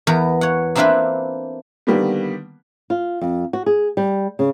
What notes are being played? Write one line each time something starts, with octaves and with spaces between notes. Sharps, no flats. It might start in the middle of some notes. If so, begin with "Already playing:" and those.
E2 B3 A#4
C#5 F#5
A#3 C4 D4 E4 F4 B4
D3 D#3 G3 A#3 B3
F4
F2
F#4
G#4
G3
C#3